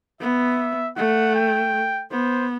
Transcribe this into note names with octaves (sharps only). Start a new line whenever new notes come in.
B3 E5
A3 F#5
G5
B3 C5